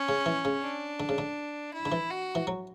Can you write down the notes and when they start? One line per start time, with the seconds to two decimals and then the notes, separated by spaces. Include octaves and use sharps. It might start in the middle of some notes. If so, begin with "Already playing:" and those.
Already playing: C#4
0.09 C#3
0.26 E3
0.45 C#3
0.63 D4
1.00 D3
1.09 C#3
1.18 D3
1.73 E4
1.86 D3
1.92 E3
2.11 F#4
2.35 E3
2.47 F#3